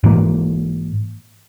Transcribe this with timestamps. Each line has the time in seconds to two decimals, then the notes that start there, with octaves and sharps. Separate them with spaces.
0.04 G#2 E3 A#3